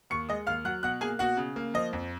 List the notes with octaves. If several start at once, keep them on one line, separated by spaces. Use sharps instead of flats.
D#2 C#6 C#7
G#3 D#5 D#6
D#2 F5 F6
F#3 F#5 F#6
B2 F#5 F#6
A#3 G#4 G#5
B2 F#4 F#5
C#3
A#3
F3 D#5
F2